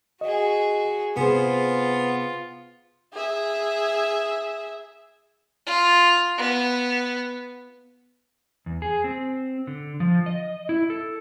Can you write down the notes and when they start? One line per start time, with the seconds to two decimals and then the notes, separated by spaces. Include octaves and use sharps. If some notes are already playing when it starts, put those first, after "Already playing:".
0.21 F#4 G#4 D#5
1.17 C3 B3 F4 G#4 C5
3.13 G#4 E5
5.66 F4
6.38 B3
8.66 E2
8.82 G#4
9.04 C4
9.67 D3
10.00 F3
10.26 D#5
10.69 E4
10.90 A4